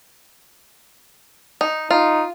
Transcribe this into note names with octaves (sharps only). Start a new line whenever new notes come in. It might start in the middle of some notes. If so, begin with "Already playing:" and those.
D#4
D#4 F4